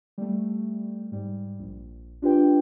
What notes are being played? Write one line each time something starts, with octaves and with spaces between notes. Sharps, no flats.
G3 A3
G#2 G3
A#1
D4 F4 G4 B4 G5